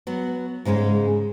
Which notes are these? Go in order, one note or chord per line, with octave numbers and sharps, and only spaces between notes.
F#3 B3
G#2 C#3 G#3 C#4